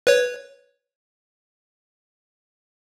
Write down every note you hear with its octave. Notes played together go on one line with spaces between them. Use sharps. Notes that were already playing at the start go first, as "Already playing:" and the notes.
B4 C#5